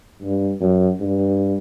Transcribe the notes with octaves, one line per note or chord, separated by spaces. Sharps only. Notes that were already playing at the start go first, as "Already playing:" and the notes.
G2
F#2
G2